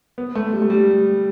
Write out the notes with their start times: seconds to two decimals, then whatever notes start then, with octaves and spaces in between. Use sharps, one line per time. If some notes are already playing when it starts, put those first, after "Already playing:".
0.18 B3
0.35 A3
0.53 G3
0.62 A3
0.70 G3